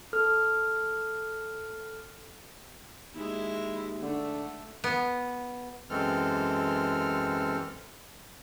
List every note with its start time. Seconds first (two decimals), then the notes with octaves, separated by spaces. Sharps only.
0.13 A4 F6
3.14 D#2 G#3 E4
4.02 D3 A3
4.84 B3
5.90 F#2 E3 G#3 C4 A4 F6